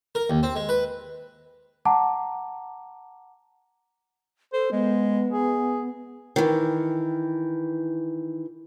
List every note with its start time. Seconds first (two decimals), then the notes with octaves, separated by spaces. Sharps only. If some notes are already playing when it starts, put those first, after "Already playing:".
0.15 A#4
0.30 D#2
0.43 C4
0.55 G#3
0.69 B4
1.85 F#5 A5 A#5 D6
4.53 A4 C5
4.72 G#3 B3
5.30 G#4
6.36 D#3 E3